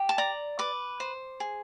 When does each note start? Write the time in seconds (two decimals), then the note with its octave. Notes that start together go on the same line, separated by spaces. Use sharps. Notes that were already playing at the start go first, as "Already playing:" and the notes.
Already playing: G4
0.09 A5
0.18 D5 A#5
0.59 B4 D6
1.00 C5
1.40 G#4